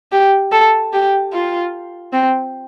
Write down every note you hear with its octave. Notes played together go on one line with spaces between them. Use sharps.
G4
A4
G4
F4
C4